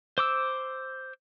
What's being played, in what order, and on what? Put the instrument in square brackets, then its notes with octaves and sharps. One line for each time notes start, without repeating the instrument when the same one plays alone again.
[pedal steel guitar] C5 D6 E6